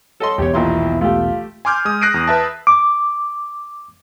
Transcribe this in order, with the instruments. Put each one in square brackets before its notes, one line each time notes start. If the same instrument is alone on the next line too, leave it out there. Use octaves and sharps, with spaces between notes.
[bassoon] F#3 [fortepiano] A4 D#5 C6
[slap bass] E1 B1 E2 [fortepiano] G4 C#5
[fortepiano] D#2 A#2 C6 [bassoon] E4
[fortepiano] A3 G4 [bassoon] F4
[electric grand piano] G#5 C6 D6 F6 G6 G#6
G#3 D#6
D#6 F#6 A#6 C7 D7 D#7
E2
B4 E5 A5
[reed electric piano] D6